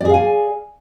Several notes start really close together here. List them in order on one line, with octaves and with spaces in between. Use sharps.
D5 G#4 F5 G#5